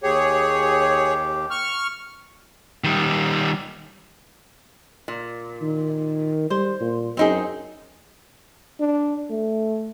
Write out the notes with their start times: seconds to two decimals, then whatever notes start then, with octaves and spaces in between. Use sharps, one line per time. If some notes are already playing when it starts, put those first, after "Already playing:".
0.03 D#2 G4 G#4 C#5
1.51 C#6 F6
2.84 D#3 G3
5.08 A#2
5.62 D#3
6.50 G3 C5
6.81 A#2
7.17 F#2 C4 D#4 G#4
8.80 D4
9.30 A3